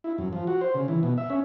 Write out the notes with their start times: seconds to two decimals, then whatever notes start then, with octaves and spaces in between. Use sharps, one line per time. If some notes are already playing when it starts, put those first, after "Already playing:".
0.04 E4
0.18 F#2
0.33 F3
0.47 F#4
0.61 C5
0.75 C#3
0.88 E3
1.03 B2
1.18 E5
1.30 C#4